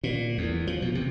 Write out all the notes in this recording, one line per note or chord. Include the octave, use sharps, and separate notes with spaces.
A#2
E2
F3
B2
C3